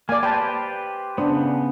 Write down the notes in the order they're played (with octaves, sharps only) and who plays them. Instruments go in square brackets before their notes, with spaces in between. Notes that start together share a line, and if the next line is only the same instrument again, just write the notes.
[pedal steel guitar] A#3 [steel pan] D5 G#5
[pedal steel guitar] G4 B4 C5 [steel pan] G5 A5
[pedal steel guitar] C#3 B3 [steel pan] D4 C5